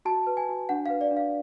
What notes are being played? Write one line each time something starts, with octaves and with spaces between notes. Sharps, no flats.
F#4 A5
B4
G#5
F#4
D4 F#5
F5
B4
D5
D4
F5